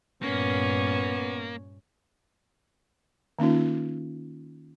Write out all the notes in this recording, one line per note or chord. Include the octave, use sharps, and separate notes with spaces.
G2 A#2 A#3 B3 C#4
D#3 A#3 C#4 D#4 F4